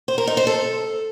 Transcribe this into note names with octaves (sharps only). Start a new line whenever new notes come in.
C5
A#4
D#4
C5
A4